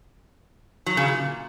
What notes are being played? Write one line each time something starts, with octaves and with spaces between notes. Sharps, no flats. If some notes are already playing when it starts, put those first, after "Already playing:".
F#3
C#3
A#2